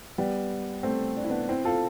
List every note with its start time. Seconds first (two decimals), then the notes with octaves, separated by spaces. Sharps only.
0.18 G3 B3
0.83 A3 C4
1.17 D4
1.24 E4
1.30 B3 D4
1.49 C4 E4
1.65 F4 A4